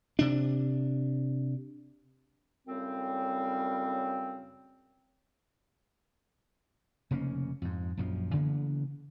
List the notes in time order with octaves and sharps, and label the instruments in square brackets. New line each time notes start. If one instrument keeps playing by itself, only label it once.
[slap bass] C3 D4
[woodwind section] F#2 A2 C#3 G3 C4
[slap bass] F1 C#3 A#3 C#4
F2 G#2
A#1 F#2 F3
C#3 E3 A#3 B3